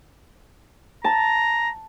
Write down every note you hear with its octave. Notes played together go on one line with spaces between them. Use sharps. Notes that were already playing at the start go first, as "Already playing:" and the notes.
A5 A#5